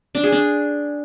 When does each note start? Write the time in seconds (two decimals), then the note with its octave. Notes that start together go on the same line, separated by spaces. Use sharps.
0.15 D4
0.23 G#4
0.32 D4